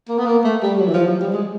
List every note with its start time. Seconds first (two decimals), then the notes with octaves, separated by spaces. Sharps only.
0.09 A#3
0.18 B3
0.26 A#3
0.44 A3
0.63 G3
0.79 F#3
0.88 E3
0.94 F3
1.07 F#3
1.21 G3
1.33 G#3